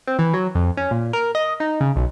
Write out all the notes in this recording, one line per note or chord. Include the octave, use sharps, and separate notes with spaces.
C4
E3
F#3
F2
C#4
A#2
A#4
D#5
D#4
C#3
B1